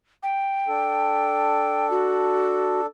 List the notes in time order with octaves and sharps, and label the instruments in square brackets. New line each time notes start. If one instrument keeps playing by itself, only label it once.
[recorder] G5
[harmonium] D4 A4
[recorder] F#4